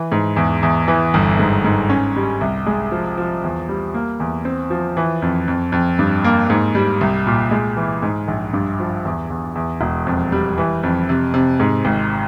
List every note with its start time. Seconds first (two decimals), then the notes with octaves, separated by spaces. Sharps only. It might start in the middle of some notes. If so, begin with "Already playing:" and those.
Already playing: E3
0.12 G#2
0.36 E2
0.63 E2
0.88 E3
1.14 G1
1.39 G#2
1.64 G#2
1.89 C#4
2.16 G3
2.41 C2
2.66 G#3
2.92 F3
3.17 F3
3.44 E2
3.69 G3
3.94 A#3
4.20 E2
4.45 C4
4.70 F3
4.97 E3
5.22 F2
5.48 F2
5.72 F2
5.99 G2
6.24 A#3
6.50 G#2
6.75 G3
7.01 C2
7.27 A#2
7.51 G#3
7.77 E3
8.02 G#2
8.28 A#1
8.53 G2
8.80 F3
9.05 E2
9.30 E2
9.55 E2
9.81 E1
10.07 F2
10.32 G3
10.58 E3
10.83 F2
11.09 C3
11.34 C3
11.60 G#2
11.85 G#1